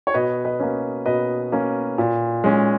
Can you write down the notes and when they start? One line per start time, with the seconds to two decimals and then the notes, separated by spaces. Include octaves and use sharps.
0.07 C#5
0.14 B2 B4 D#5
0.45 B4 D#5
0.60 A#3 C#4
1.06 B2 B4 D#5
1.52 A#3 C#4
1.98 A#2
2.44 G#3 C#4